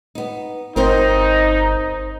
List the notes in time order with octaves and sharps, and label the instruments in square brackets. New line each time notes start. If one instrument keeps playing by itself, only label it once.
[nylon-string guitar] B3 D#4
[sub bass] G1 [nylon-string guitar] C4 A#4 C5 [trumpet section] D#4